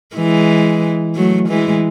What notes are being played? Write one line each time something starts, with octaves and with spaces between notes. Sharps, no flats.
E3 G#3
F#3 A3
E3 G#3